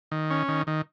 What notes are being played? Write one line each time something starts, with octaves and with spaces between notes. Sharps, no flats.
D#3
C#4
D#3
D#3